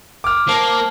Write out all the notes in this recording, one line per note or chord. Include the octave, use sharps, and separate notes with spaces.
D6 F6
A#3 C5 A5